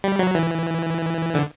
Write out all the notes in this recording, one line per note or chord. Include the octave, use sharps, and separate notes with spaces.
G3
F#3
E3
D3